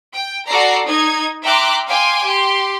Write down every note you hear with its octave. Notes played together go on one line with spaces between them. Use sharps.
G5
F#4 A4 D5 A#5 C7
D#4 G#6
E5 G5 A#5 C6 D6 F#6
F5 G5 G#5 C6 D6
G4 C6